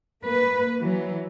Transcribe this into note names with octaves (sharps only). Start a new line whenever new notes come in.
A#3 B4
E3 F#3